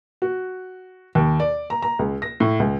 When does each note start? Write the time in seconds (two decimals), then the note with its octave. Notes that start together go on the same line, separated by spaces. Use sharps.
0.22 F#4
1.15 D#2
1.40 D5
1.70 A#5
1.82 A#5
1.99 C#2
2.22 A#6
2.40 A2
2.60 C#2